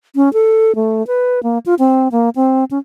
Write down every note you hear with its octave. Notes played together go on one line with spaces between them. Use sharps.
C#4
A4
A3
B4
A#3
F4
C4
A#3
C4
C#4